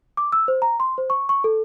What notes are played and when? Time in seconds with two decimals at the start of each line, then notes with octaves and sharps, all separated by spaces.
0.17 D6
0.32 E6
0.48 C5
0.62 A#5
0.80 C6
0.98 C5
1.10 C#6
1.29 C#6
1.44 A4